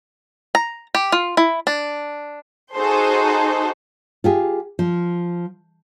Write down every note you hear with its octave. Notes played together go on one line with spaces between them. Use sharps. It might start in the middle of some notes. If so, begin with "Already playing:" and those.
A#5
G4
F4
E4
D4
D#4 F#4 G#4 A4 C5
F4 G4 G#4
F3